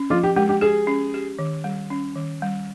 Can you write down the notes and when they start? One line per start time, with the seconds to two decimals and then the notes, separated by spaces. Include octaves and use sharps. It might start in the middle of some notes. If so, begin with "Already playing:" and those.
Already playing: C#4
0.10 F3 F4
0.23 G4
0.36 G#3 G4
0.49 G4
0.61 G4 G#4
0.87 C#4
1.14 G4
1.39 D#3
1.64 G3
1.90 C#4
2.16 D#3
2.42 G3